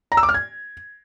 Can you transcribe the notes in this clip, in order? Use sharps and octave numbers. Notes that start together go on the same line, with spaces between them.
A#5
E6
D6
F6
G#6